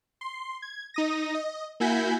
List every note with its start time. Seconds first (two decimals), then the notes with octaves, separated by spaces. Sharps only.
0.21 C6
0.62 G#6
0.94 D#4 D#6 A#6
1.35 D#5
1.80 A#3 E4 F#4 G#5 G6 B6